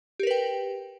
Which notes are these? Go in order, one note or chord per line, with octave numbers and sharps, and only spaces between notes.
G4 A#4 B4 G5